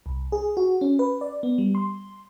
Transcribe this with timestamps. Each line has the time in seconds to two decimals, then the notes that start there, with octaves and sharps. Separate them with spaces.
0.06 C2
0.32 G#4
0.57 F#4
0.81 C#4
0.99 B4
1.21 D5
1.43 B3
1.58 G3
1.75 C6